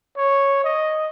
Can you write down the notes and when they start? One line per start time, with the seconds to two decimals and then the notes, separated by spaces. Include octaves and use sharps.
0.17 C#5
0.64 D#5